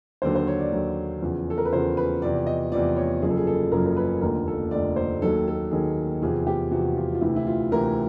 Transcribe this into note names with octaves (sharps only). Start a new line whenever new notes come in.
D#2 D3 F#3 C5
C5
C#5
D5
D#2 D3 F#3
E2 C#3 F3
A4
A#4
B4
E2 C#3 F3 C5
B4
E2 C3 F3 D5
D#5
E2 C3 F3 D5
C#5
F#1 F#2 C#3 F3 G#4
A4
G#4
A4
F#1 F#2 C#3 F3 A#4
A#4
B4
F1 D#2 D3 F3 A#4
A4
F1 D#2 D3 F3 D5
C5
D#2 D#3 F#3 A4
A4
D#2 D#3 F#3 G#4
E2 C3 F3 G#4
G4
E2 C3 F3 F#4
F4
F4
D2 C3 E3 E4
E4
F4
D2 C3 E3 A#4